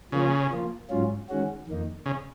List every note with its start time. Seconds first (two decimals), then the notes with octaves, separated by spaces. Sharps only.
0.12 C#3 F3 A#3 F4
0.50 F3 A#3 F4
0.90 G#2 F#3 C#4 F4
1.29 D#3 G#3 C#4 F#4
1.67 F2 D#3 A#3 D#4
2.06 C#3